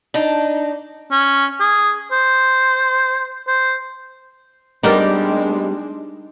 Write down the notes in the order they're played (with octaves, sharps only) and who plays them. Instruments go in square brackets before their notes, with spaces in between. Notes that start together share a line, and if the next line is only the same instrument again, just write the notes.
[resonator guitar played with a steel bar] D4 D#4
[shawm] C#4
G#4
C5
C5
[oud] G3 B3 C4 [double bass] G#3 D4 [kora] D#4 A#4 D5